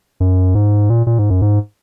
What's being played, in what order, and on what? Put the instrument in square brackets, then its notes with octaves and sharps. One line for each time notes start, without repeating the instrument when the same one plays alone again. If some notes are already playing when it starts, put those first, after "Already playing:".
[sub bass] F#2
G#2
A#2
A#2
G#2
F#2
G#2